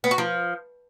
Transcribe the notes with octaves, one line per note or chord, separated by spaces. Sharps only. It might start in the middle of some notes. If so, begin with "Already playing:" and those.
B3
F#4
F3